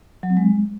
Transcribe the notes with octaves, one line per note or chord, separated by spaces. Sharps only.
F#3
C4
G#3